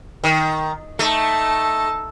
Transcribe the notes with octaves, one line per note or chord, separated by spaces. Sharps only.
D#3
A3 D#4 A5